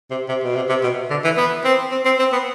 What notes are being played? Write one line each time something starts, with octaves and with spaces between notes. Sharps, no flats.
C3
C3
B2
C3
C3
B2
D3
E3
B3
C4
C4
C4
C4
B3